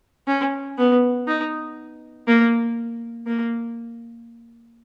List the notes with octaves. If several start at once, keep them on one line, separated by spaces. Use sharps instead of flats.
C#4
B3
D#4
A#3
A#3